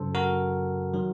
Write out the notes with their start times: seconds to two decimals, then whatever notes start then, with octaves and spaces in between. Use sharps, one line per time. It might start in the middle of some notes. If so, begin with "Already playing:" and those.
Already playing: F#2 C#3 F#3 A4 C5
0.15 F#4 A#4
0.94 D#3 F#3